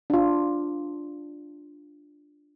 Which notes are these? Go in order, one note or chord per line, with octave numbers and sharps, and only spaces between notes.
D4 F4